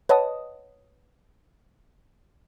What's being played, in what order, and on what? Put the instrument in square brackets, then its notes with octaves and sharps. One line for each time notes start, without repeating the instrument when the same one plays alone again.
[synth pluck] B4 C#5 D#5 F#5 A5 D#6